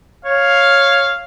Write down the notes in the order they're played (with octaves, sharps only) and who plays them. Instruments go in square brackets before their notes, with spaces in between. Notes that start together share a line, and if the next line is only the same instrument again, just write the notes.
[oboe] C#5 [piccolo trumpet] F5